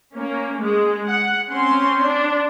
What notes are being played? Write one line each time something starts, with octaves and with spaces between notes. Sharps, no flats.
A#3 C#4
G#3
F#5
C4 C#4 C6
D4